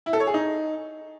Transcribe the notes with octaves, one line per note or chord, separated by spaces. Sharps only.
E4
A4
C#5
G#4
D#4